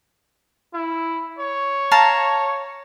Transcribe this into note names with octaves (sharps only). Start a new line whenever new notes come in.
E4
C#5
F5 A5 A#5